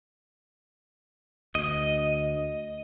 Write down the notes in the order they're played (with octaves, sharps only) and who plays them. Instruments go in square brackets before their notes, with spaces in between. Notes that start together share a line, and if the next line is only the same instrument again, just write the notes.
[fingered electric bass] D2 [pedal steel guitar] D#5